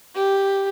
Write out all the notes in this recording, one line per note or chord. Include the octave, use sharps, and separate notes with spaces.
G4